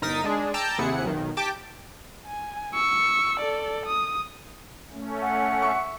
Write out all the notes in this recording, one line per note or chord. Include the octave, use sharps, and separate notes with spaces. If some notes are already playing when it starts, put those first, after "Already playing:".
G1 D#4 A#4 D#6 A6 B6
G#3 D4 G#4
G5 A5 A#5 D6 E6 G6
D#2 C3 E4 G#4 F#5 C#7
B1 D#3
G4 G5 A5 D6
G#5
C#6 E6
A4 D5
D#6
A3 C#4
F#5
E5 C#6